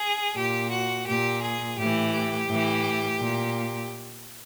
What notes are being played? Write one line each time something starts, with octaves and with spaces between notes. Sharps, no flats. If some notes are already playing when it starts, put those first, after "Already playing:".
Already playing: G#4
A#2 G4
F#4
A#2 G4
G#4
A2 E3 G4
G4
A2 E3
A#2